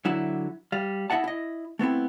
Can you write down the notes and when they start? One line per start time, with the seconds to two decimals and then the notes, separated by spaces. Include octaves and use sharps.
0.05 D3 F#3 E4
0.72 G3 F5
1.10 E4 D#5 E5 F#5 A5
1.24 E4 D#5
1.79 A3 B3 C4 E4